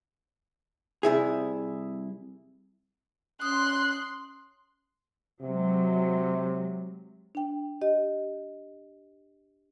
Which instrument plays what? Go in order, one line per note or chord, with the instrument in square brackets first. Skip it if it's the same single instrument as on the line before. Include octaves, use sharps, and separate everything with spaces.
[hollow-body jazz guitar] C2 C3 E4 G#4
[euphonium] C#4 [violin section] C6 [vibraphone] D#6 [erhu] F#6
[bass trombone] C3 [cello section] F#3 G#3
[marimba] D4 G5
G4 D#5